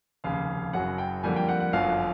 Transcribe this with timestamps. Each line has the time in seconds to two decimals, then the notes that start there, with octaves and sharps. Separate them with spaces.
0.24 F1 D#2 C#3 F5
0.73 F#1 F#2 C#3 F#3 F#5
0.98 G5
1.23 F2 D3 G3 A#3 G#5
1.36 G5
1.49 F#5
1.60 F#5
1.73 G1 F#2 D3 F3 F5